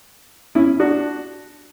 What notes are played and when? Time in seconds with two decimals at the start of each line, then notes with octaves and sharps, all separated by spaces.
0.55 C#4 E4
0.80 D4 F#4